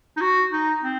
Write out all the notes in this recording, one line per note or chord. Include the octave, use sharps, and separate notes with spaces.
D#4
F#4
D#4
C4